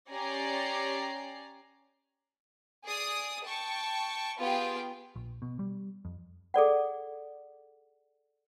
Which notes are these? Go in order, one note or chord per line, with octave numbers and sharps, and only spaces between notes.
C#4 G4 D5 G#5 A#5 C7
G#4 D5 D#6
G5 A5 C#6
B3 F4 G4 G#4 G5
A#1
B2
G3
F2
G#4 A4 D5 F#5